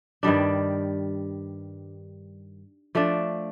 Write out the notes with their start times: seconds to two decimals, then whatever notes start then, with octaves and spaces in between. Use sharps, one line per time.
0.23 G2 D#3 G3 D4
2.95 F3 A3 D4